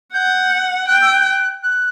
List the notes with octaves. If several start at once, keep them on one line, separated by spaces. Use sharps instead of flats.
F#5 G6
G5 F#6
E6
F#6
F#6